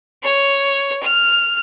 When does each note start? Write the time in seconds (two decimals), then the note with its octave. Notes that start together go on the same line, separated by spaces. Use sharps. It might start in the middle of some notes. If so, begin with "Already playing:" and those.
0.24 C#5
1.03 F6